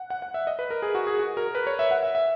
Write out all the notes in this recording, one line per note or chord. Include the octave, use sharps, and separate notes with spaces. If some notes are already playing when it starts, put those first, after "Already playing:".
Already playing: F#5
F#5
F#5
E5
D#5
B4
A#4
G#4
F#4
G#4
F#4
A#4
B4
C#5
E5
F#5
E5
E5